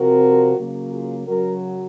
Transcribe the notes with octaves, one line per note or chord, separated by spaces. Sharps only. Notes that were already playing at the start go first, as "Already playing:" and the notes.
Already playing: C3 F3 C4 F#4 A#4
C#3 F#3 A#3
F4 G#4
F#2 C#3 F#3 F#4 A#4